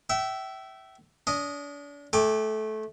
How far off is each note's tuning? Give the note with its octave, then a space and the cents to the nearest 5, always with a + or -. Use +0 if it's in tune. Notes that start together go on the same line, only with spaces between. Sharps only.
E5 +0 G5 -35
D4 -40 D#5 -5
A3 -20 G5 +30 D6 +0